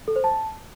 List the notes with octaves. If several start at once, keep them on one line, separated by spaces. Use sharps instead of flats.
A4
C5
A5